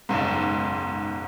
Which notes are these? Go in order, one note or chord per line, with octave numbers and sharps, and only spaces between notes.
F#1 B1 G#2